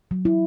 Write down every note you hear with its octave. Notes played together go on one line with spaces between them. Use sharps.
F#3
E4